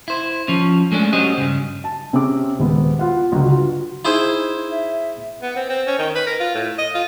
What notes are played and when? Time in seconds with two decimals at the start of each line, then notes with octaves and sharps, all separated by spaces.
0.08 E4 C5
0.48 F3 C#4
0.92 G#3 A3 C#4 D4
1.13 F#3 C#4 G4 C5 D#5
1.38 G2 C#3
1.84 A5
2.13 C3 C4 C#4 G#4 D6
2.59 D#1 G#3 B3
2.99 F4 F#5
3.32 G1 C#2 F#3
3.50 F4 F#4
4.05 D#4 E4 G#4 C5
4.71 E5
5.42 B3
5.56 C4
5.69 C4
5.87 C#4
5.99 D#3
6.15 B4
6.27 A#4
6.40 F4
6.55 A2
6.78 D#5
6.95 F4